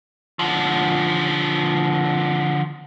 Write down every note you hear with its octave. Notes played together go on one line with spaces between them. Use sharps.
D3 F3